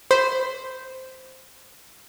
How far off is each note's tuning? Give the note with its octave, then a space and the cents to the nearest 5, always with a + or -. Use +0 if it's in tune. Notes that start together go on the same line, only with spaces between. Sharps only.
C5 +0 B5 +15